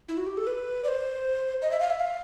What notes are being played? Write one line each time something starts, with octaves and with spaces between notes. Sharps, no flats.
E4
F#4
G4
A4
B4
D5
C5
D#5
E5
F5
E5
F5